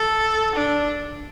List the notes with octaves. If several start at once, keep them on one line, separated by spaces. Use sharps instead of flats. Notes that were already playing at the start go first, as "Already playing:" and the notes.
Already playing: A4
D4